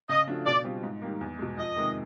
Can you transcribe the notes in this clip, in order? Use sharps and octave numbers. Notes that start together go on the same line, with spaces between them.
C#3 D#5
F3 A3 D4 F#4
B2 D5
G3 C4 F4
G#2
D#3 G3 A#3
E2
B2 G#3
F2 D#5
C3 D#3 G#3